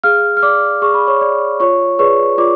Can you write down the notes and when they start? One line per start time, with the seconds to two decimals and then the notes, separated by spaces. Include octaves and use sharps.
0.04 G#4 F5 F6
0.37 F6
0.43 D5 D6
0.82 G#4 C#6
0.94 B5
1.07 C#5 C#6
1.21 D5
1.60 F4 C#5 C#6
1.99 G#4 B4 C#5 D5 C#6
2.38 F4 D5 D6